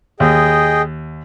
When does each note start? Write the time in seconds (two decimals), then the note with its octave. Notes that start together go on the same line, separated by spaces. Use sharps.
0.20 D#2 G#4 D#5 G5